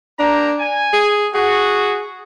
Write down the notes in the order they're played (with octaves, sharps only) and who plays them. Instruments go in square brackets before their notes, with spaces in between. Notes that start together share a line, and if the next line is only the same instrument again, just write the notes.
[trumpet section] A#3 G4 A#5 [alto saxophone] D4
[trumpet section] G#5
[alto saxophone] G#4
[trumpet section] F#4 [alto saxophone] G#4